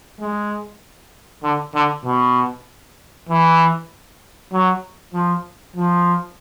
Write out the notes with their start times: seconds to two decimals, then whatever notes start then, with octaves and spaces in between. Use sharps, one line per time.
0.19 G#3
1.43 D3
1.74 D3
2.05 B2
3.29 E3
4.52 F#3
5.14 F3
5.76 F3